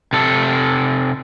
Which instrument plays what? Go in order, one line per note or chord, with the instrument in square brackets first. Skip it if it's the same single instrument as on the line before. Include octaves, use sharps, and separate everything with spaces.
[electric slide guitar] C3 A4